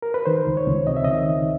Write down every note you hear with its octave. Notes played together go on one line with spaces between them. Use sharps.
A#4
B4
D#3 C5
C#2
C#5
C#2
C3 D#5
E5
D#5
D#3
C#2